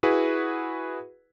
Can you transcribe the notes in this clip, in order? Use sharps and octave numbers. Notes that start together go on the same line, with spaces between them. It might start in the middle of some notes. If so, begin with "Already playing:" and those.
E4 F#4 G#4 B4